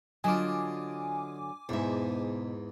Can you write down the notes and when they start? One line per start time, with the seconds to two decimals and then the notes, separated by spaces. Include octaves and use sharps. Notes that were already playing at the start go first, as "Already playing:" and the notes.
0.24 D3 F#3 F4 D#5 G#5 D6
1.69 E2 G#2 B2 E5